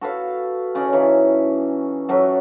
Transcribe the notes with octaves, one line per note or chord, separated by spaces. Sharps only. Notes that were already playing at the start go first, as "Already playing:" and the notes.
F#4 A4 B4 F5
C#3 C#4 D5 D#5
E3 C#4 D#4
F#2 F#3 A4 E5